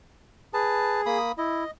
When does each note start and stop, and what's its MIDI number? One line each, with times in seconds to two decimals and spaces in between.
0.54 1.18 68
0.54 1.01 71
0.54 1.01 81
1.06 1.32 58
1.06 1.32 83
1.06 1.32 87
1.38 1.64 64
1.38 1.71 75